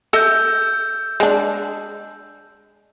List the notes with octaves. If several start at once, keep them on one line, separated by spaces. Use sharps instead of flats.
A4 D#5 E5 E6 G6
G#3 D4